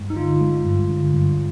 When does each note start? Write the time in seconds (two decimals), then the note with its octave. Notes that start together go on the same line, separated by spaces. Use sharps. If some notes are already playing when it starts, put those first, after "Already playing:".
Already playing: G2 G#3
0.10 D#4
0.16 D3 F4
0.41 G#3
0.65 G2
0.90 D3
1.14 G2